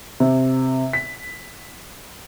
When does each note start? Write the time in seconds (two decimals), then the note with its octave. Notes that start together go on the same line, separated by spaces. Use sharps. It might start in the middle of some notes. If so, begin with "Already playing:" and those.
0.20 C3
0.93 B6